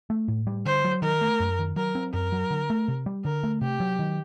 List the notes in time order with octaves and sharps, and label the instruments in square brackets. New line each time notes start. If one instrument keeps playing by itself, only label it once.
[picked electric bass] A3
A2
G3
[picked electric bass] D3 [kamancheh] C5
[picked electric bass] F#3
[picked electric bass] D#3 [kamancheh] A#4
[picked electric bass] A3
F#2
D#3
[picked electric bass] F#3 [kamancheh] A#4
[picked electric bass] C4
[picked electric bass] F#2 [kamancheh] A#4
[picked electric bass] F#3
D3
A3
C3
G3
[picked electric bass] D3 [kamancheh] A#4
[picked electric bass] A3
[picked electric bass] C3 [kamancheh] G4
[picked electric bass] F#3
D#3